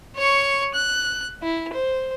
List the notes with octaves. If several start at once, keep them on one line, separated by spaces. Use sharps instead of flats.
C#5 C#6
F#6
E4
C5